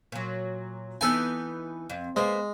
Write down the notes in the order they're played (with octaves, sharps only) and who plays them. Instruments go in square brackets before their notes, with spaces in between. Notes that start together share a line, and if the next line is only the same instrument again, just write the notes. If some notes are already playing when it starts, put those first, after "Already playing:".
[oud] A#2 F#3
[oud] E3 B3 D#4 [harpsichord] A4 G#5
[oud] F2
[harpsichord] G#3 [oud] A#3 B3 C5